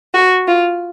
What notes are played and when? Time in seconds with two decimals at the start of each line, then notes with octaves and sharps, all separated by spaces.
0.14 F#4
0.47 F4